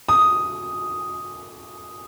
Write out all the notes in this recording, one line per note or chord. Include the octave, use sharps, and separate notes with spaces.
D#6